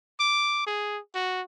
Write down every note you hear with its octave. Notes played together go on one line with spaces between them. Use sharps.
D6
G#4
F#4